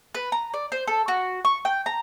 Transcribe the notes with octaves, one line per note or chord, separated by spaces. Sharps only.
B4
A#5
D5
C5
A4
F#4
C#6
G5
A#5